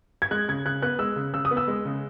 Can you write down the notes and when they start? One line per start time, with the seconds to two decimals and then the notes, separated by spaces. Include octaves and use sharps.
0.22 G#6
0.31 G#3 F#6
0.49 C#3 G#6
0.66 C#3 F#6
0.82 B3 F#6
0.99 G#3 E6
1.16 C#3
1.34 C#3 E6
1.45 D#6
1.51 B3
1.57 E6
1.68 G#3
1.85 C#3